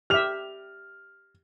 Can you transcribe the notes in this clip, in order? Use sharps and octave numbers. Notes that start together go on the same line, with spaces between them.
G4 E5 F6 F7